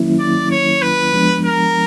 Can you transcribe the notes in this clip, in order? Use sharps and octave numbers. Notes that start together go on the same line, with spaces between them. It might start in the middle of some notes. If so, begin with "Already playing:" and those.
Already playing: D#3 F#3 A#3 C#4 E4
D5
C#5
B4
F3 G#3 B3 D4
A#4